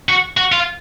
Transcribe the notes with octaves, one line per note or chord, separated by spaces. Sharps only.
F#4
F#4
F4